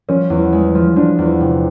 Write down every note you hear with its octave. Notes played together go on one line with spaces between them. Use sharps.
F3 C#4
E2
G#3
F3
F3 D4
E2
C3